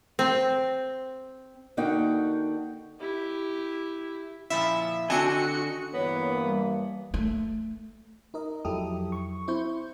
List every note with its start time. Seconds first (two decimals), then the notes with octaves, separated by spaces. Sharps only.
0.19 C4
1.77 D3 A#3 D#4 F#4 F#5 G5
3.00 E4 G4
4.50 A#2 F3 E4 E5
5.10 D3 C4 F#4 D5 D#5 G#5 A5 C#7
5.94 G2 E3 A#3 B3 C#5
6.43 G3
7.14 A3
8.34 D#4 A#4 D#5
8.65 F2 F#3 E4 G4 A4 D#6
9.12 C#6
9.48 C4 E4 C5 C#6 G6